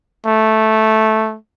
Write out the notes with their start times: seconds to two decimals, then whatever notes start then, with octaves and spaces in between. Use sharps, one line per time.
0.26 A3